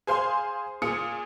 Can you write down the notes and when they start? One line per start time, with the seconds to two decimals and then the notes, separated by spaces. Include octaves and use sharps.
0.07 G#4 C5 F5 G#5 C6
0.82 A#2 F4 G#4 D#6 C#7